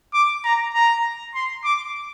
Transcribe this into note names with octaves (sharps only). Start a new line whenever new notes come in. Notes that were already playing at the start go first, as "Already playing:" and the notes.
D6
A#5
A#5
C6
D6